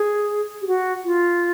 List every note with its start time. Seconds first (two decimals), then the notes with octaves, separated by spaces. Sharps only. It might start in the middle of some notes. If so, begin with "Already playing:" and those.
Already playing: G#4
0.62 G4
0.67 F#4
1.05 F4